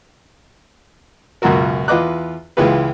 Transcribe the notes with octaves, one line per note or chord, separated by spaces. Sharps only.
C#2 F#2 B2 F4 F#4 A#4
E2 F4 B4 D#5 D6 F#6
C#2 E3 G#3 F4 G4 B4